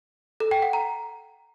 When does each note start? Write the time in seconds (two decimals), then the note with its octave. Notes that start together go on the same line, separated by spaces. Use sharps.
0.40 A4
0.51 G5
0.62 F#5
0.73 A#5